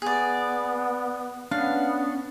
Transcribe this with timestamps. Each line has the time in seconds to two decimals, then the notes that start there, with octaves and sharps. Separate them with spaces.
0.02 B3 G#4 D5
1.51 B3 C#4 D4 F5